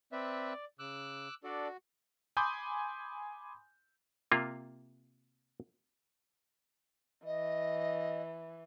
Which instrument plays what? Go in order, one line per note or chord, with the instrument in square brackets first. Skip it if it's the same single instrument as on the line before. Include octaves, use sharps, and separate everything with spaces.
[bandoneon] C4 B4 E5 [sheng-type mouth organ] D5
[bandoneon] C#3 [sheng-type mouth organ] D6 E6 F#6
[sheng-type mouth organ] D4 A4 D5 [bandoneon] F#4
[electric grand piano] G#5 B5 C6 D6 D#6 G6
[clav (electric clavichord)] C3 A#3 F4
[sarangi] E3 [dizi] D#5